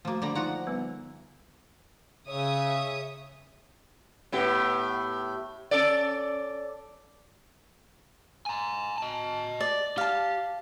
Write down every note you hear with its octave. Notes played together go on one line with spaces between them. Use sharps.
F3 A3 A#3 F#4
D3 G3 A#5
F3 D#4 F4 F#5 A#5
G3 B3 B4
C#3 C#5 E5 D#6
A2 B3 G4
C#4 A4 D5
G#5 A#5
D#5 A5
D5
G4 F5 A5